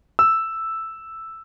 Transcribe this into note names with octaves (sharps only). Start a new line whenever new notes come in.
E6